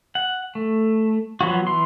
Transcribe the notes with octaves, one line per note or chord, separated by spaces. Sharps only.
F#5
A3
F3 F#3 B3 F#4
E3 C6